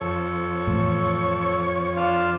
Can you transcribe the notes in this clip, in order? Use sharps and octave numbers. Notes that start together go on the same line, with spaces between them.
F2 A4 C#5
E2 A2
D4 F4 F5